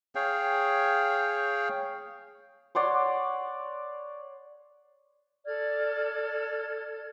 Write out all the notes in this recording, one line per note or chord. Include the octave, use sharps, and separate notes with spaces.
G#4 C#5 F5 G5
C#5 D5 F#5 C6
A4 D5 F6 G#6